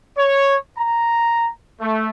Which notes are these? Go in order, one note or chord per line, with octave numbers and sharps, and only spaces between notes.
C#5
A#5
A3